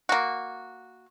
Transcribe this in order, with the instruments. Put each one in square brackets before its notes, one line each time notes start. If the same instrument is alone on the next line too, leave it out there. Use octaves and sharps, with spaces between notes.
[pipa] A#3 F#4